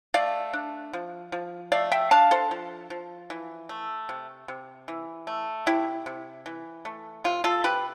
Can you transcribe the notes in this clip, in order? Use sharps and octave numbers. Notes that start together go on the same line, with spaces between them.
A3 D5 F5
D4
F3
F3
A3 D5 F5
E5 G5
D4 F5 A5
A4 C5
F3
F3
E3
A3
C3
C3
E3
A3
C3 E4 G4
C3
E3
A3
C3 F4
F4 A4
C3 G4 B4